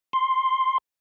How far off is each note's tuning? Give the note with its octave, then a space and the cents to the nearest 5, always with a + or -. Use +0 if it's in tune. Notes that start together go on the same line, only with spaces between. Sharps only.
C6 +5